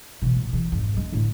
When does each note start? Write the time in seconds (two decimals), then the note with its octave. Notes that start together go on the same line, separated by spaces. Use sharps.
0.22 B2 E3
0.35 A1
0.53 C#3 E3
0.72 G#1 F2
0.96 G#3 C#4
1.13 A2 D3